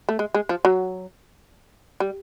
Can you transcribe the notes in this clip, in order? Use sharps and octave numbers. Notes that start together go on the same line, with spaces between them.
A3
G#3
G#3
F3
F#3
G3